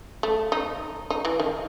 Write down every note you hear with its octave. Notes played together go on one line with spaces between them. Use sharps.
A3
D#4
D#4
E3
D#3